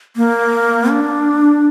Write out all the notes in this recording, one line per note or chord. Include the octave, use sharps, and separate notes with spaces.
A#3
D4